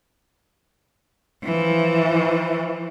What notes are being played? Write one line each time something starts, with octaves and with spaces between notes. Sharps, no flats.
E3 F3